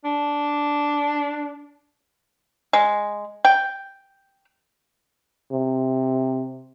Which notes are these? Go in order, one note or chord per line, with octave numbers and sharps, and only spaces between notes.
D4
G#3
G5
C3